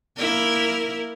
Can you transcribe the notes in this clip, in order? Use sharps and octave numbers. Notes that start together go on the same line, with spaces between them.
A#3 E4 A#4